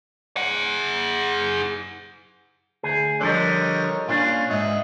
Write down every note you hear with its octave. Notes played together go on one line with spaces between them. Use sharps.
G#4 F#5
D2 G#4
D3 F3 G3 A#4 C#5 D#5
A#2 C#4 D4 F4
G#2 D#5 E5 F#5